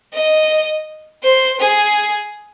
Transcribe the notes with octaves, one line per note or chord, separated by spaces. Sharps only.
D#5
C5
G#4